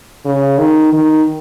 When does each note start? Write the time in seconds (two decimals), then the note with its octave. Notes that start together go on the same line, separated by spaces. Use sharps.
0.25 C#3
0.58 D#3
0.93 D#3